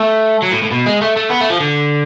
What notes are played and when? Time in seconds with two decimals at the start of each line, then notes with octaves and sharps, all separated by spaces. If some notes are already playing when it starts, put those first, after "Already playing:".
Already playing: A3
0.42 F#3
0.52 A2
0.62 A2
0.71 B2
0.86 G#3
1.01 A3
1.16 A3
1.30 B3
1.41 A3
1.50 F3
1.60 D3